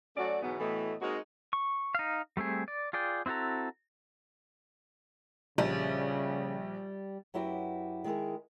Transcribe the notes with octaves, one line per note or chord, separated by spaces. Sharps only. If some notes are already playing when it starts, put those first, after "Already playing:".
F#3 A3 C#4 F#4 D5
G#2 B2 E3 F#3 B3
A2 E3 A3 B3 F#4 D#5
G#3 A#3 C4 D#4 F#4 A#4
C#6
D#4 F5
G3 A3 C4 G#4
D5
F4 G#4 D5 G5
C4 E4 F#4 A4 A#5
A#1 C#3 G3
F#2 F#3 E4 F#4 G4 B4
D#3 G#3 E4 G#4 A#4